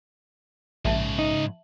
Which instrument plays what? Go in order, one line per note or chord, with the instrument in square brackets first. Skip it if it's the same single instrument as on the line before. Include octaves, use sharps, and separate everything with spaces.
[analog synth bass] A#1 [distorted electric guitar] G#2 C#3 [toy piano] E5 A5
[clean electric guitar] D#4